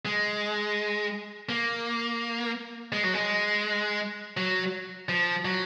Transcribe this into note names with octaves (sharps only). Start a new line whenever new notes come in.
G#3
A#3
G#3
F#3
G#3
F#3
F3
F#3